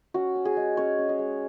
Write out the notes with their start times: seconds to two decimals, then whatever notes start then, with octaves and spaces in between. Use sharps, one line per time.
0.14 C#4 F#4
0.35 C#4
0.45 G#4
0.57 G#3
0.77 C#4 C#5
0.99 C#4
1.09 D#5
1.19 G#3